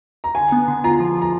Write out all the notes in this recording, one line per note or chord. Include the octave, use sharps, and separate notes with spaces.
A#5
D3 G#5
B3
D3
F4 A#5
F3
F3 A#5